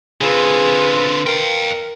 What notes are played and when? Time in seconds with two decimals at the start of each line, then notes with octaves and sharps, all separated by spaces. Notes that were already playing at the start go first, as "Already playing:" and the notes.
0.21 D3 C4 F4 G#4 B4
1.27 A#4 F5 G5